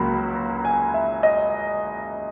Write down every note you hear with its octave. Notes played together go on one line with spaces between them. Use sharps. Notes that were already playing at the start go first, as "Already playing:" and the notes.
Already playing: C#2 C#3 F#3 A#3 B5
A#5
G#5
E5
D#5